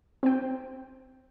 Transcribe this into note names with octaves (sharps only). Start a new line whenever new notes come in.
C4 G5